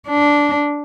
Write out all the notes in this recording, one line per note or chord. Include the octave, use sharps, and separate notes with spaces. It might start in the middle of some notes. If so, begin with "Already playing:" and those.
D4